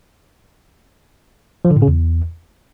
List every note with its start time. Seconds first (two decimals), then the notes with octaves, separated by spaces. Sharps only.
1.65 F3
1.70 D3
1.76 A2
1.82 C#3
1.88 E2